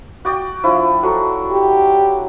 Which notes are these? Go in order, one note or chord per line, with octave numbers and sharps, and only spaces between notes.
F#4 D5 G5
F3 D4 E4
F#3 F#4 A4
G4